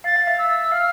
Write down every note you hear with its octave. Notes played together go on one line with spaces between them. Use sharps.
F5 A6
F5
E5
E6
F5 F6